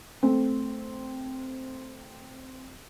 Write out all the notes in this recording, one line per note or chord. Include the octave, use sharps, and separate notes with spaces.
A3 C4